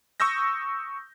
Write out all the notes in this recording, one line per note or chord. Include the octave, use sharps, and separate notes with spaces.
C#6 D#6 E6 G6 A#6